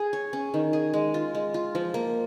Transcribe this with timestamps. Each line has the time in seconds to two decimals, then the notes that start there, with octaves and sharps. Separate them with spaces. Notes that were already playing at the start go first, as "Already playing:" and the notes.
Already playing: G#4
0.13 C#5
0.33 C#4
0.54 D#3
0.73 G#4
0.93 G#3
1.14 F4
1.35 G#3
1.54 F4
1.75 F3
1.94 A#3